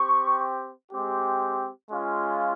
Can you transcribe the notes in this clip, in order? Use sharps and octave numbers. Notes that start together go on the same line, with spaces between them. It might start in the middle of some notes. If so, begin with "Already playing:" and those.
Already playing: C4 G4 C#6
G#3 C4 G4
G#3 C#4 F4